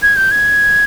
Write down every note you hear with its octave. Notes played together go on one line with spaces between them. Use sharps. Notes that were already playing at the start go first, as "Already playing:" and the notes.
G#6
G6
G#6